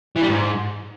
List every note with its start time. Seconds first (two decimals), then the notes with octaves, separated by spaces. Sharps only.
0.16 E3
0.22 G3
0.29 G#2